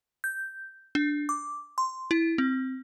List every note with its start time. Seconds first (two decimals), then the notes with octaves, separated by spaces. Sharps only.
0.24 G6
0.95 D4
1.29 D6
1.78 C6
2.11 E4
2.38 C4